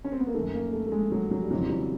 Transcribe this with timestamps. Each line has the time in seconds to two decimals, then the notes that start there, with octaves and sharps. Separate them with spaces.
0.05 C#4
0.12 C4
0.19 B3
0.27 A#3
0.34 F#2 D#3 A3
0.54 A#3
0.73 A3
0.87 A3
0.92 G#3
1.12 F#3
1.31 F#3
1.43 G3
1.51 F2 C#3 E3 F#3
1.65 G3
1.69 F#3